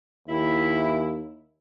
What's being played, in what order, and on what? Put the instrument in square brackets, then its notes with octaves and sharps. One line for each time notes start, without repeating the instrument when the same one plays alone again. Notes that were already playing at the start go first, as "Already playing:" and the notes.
[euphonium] D#2 [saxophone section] E4